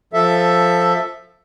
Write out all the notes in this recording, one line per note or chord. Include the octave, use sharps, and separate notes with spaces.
F3 A4 E5